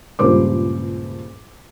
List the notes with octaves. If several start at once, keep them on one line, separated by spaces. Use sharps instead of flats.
C#2 G2 A#2 C5 D6